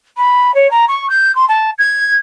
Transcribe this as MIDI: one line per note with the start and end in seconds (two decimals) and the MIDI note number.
0.17 0.54 83
0.55 0.70 73
0.71 0.85 82
0.88 1.09 85
1.10 1.34 91
1.35 1.45 84
1.48 1.70 81
1.78 2.15 92